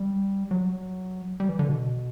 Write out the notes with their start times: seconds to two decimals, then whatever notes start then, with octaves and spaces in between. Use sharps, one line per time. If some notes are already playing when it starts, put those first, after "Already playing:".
Already playing: G3
0.51 F#3
1.40 G3
1.49 E3
1.59 D3
1.69 B2